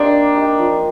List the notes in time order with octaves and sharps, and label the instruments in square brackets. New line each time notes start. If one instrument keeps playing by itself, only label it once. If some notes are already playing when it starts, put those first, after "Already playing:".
Already playing: [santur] C4 D#4 G4 A#4 C5 F5 [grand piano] D4
[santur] A#3
D#4 G4
F3